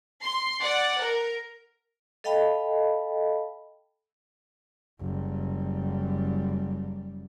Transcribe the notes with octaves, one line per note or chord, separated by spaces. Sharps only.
C6
D5 F#5
A#4
A4 D#5 F5 G5 A5 B5
F#1 G3